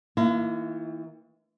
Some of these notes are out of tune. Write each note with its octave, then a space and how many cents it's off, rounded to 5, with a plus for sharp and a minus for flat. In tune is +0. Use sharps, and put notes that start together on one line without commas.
E3 -45 A#3 +0 E4 +45